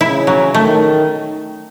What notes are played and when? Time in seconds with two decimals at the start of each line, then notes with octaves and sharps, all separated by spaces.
0.01 C#3 E4
0.27 F#3
0.54 D#3 A3